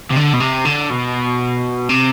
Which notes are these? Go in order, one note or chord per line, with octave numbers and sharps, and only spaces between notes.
C3
D3
B2
C3
D3
B2
C3